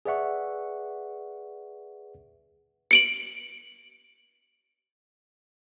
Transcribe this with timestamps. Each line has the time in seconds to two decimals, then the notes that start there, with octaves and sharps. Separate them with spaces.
0.05 G#4 B4 D5 E5 F#5 C#6
2.91 C#7 D7 F#7